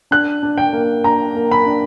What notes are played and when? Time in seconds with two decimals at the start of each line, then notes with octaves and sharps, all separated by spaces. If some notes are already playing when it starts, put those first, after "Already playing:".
0.11 D4 F#6
0.43 D4
0.58 G5
0.73 A#3
1.04 D4 A#5
1.35 A#3
1.51 B5
1.66 D4